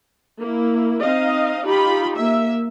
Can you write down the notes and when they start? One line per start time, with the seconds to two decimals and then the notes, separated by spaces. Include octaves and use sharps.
0.39 A#3 E4
1.00 C4 D#4 D#5 F5
1.65 D#4 F4 G4 B5
2.16 A#3 E5